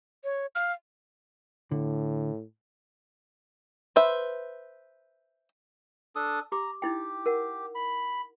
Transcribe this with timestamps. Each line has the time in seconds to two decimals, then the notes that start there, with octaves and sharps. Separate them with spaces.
0.24 C#5
0.55 F5 F6
1.71 A2 D3
3.96 B4 C5 E5
6.16 D4 A4 D#6
6.52 G4 A#5 D6
6.82 D#4 E4 G4 G5
7.26 A#4 F#5
7.75 B5